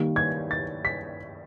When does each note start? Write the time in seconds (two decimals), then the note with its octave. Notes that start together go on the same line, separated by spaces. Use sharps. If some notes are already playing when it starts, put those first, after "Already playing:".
Already playing: D#3 G3 A#3
0.16 G#6
0.51 A6
0.85 B6